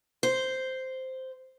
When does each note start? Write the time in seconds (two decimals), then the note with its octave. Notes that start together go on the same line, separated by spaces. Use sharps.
0.23 C5